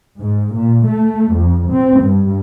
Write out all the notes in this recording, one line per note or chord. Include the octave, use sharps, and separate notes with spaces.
G#2
A#2
A3
F2
C4
G2